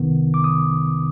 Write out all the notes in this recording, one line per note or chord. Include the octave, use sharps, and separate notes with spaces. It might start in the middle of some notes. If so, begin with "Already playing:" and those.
Already playing: C2 C3 D#3 B3
D6
D#6